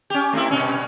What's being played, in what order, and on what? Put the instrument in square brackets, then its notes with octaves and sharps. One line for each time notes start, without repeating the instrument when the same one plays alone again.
[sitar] C#4 G4
A3 C4 E4
G2 B2 C#4